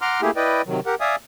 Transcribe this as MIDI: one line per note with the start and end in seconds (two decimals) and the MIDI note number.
0.01 0.21 78
0.01 0.21 82
0.01 0.21 84
0.01 0.21 86
0.01 0.21 89
0.22 0.31 57
0.22 0.31 58
0.22 0.31 64
0.22 0.31 67
0.22 0.31 68
0.36 0.62 64
0.36 0.62 71
0.36 0.62 74
0.36 0.62 75
0.36 0.62 79
0.66 0.80 48
0.66 0.80 51
0.66 0.80 54
0.86 0.95 67
0.86 0.95 70
0.86 0.95 78
1.01 1.16 74
1.01 1.16 76
1.01 1.16 77
1.01 1.16 80
1.01 1.16 87